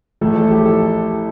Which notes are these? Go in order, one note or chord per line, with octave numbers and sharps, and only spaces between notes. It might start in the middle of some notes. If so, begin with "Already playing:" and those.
A1 A2 F3 A3 A4
A4
G4
A4